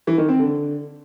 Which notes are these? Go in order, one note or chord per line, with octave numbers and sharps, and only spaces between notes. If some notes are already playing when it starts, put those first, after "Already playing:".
E3
D#3
C4
D3